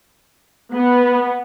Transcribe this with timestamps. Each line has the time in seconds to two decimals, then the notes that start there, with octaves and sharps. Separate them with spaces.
0.74 B3